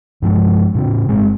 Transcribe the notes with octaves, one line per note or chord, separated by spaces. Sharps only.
G2 F3 G#3
A2 C#3 B3 C#4
G1 G#3 C4